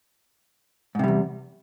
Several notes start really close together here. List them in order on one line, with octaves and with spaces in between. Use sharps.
G#2 C3 G3 E2